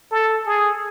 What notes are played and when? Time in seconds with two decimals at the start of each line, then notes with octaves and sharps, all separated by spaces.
0.11 A4
0.46 G#4